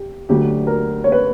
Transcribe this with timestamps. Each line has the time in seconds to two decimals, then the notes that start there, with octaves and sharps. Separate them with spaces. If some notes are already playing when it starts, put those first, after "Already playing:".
Already playing: G4
0.29 D2 D3 F#3 G4
0.67 A#4
1.04 C#5
1.12 B4